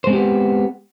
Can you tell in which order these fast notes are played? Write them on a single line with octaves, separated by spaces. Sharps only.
C5 G#3 C4 G4 B3